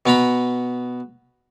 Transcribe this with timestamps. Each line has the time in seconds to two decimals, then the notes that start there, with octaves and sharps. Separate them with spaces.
0.06 B2 B3 A#5 B5